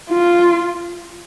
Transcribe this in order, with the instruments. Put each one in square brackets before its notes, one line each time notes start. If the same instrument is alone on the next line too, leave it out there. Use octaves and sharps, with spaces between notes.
[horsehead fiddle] F4